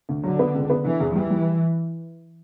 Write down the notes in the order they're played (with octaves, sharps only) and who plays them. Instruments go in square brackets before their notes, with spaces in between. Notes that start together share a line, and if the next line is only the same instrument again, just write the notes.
[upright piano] D2
[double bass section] D3 [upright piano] F#3
[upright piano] B3
C#2
B3
[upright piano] D3 [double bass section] E3
[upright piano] E2
[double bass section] E3 [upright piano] G3
[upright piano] G3